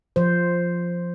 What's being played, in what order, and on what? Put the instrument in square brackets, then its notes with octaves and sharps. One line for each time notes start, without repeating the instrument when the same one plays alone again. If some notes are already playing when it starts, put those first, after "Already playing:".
[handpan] F3 C5